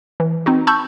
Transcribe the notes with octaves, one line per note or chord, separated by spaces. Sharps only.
E3
C4 D#4 F#4
A5 B5 C#6 E6 G6